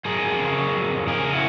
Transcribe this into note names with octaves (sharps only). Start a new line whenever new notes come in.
F#3 G#4 A#4
F2
C#3
F#3
F2
F2
C#3 G#4 A#4
C#3
E4 F#4